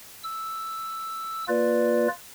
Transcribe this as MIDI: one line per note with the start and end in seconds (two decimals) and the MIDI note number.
0.24 1.44 88
1.48 2.08 58
1.48 2.08 65
1.48 2.08 71
1.48 2.08 74